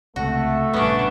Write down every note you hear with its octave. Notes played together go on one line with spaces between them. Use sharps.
C#2 C3 A3 F#4
A#1 G2 C#3 B3 C#4 D4 B4